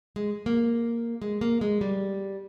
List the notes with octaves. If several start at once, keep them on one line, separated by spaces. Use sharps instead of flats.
G#3
A#3
G#3
A#3
G#3
G3